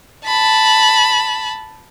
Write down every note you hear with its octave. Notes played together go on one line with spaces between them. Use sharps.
A5 B5